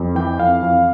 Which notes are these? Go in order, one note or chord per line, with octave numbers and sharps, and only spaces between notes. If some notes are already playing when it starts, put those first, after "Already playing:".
Already playing: F2
E3 G5
F2 F5
F2